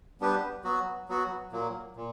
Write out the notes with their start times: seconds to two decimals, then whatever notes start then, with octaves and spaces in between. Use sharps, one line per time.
0.21 G3 B3 D4 G4 B4
0.64 F#3 B3 F#4
1.09 F#3 B3 F#4
1.52 A#2 F#3 A#3
1.96 A#2